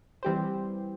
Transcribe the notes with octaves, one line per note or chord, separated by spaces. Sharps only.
E3 G3 C4 G4 C5